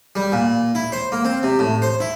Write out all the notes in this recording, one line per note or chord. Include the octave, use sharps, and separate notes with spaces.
G3
A#2
E4
C5
A#3
C4
C3
A2
C5
E4